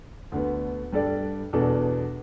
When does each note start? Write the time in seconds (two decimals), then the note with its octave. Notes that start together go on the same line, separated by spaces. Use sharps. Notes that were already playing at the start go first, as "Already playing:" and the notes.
0.32 D2 D3 B3
0.93 G2 G3 D4 A4 D5
1.53 E2 B2 B3 D4 A4